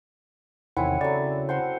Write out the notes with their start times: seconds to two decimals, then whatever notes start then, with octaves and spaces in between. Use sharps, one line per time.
0.77 E2 C3 D#3 C4 E4 C#5 F#5 G#5
1.01 C#3 F#3 A3 D5
1.49 F#4 C5 F#5 A5 C6